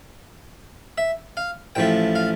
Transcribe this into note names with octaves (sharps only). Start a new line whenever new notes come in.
E5
F5
A1 A2 F3 A3 G5
F5